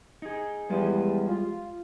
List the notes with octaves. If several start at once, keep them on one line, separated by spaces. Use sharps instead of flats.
D#4 G#4
E2 F3 G3 G#3
F4